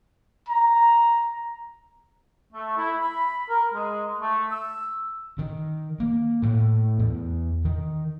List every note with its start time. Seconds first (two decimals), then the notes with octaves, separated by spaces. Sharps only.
0.48 A#5
2.53 A3
2.77 E4
3.02 B5
3.50 A#4
3.74 G#3
4.20 A3
4.51 E6
5.39 D#3
6.00 A#3
6.42 A2
6.99 E2
7.65 D#3